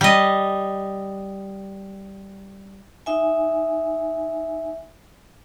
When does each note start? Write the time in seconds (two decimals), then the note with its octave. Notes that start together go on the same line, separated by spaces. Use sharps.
0.01 G3 D#5
3.06 D#4 E5 G#5